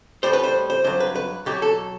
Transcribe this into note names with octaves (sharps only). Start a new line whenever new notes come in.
A2 G3 C5
B4
C5
C5
G2 F#3 C5
B4
B4
B2 F#3 G4
A4